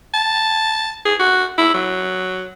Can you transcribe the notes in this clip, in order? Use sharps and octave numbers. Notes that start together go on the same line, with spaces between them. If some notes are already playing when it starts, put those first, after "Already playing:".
A5
G#4
F#4
E4
F#3